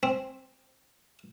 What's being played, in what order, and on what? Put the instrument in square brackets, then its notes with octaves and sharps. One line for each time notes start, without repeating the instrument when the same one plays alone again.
[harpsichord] C4